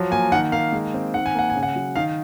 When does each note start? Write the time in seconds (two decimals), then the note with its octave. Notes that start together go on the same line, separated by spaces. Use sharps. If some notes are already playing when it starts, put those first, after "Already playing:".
Already playing: F3 F#3
0.11 A#3 G#5
0.32 D#3 F#5
0.52 A#3 F5
0.72 G#3
0.94 C4
1.14 D#3 F#5
1.26 G#5
1.35 A#3 F#5
1.50 G#5
1.55 C#3
1.63 F#5
1.76 F#3
1.96 D#3 F5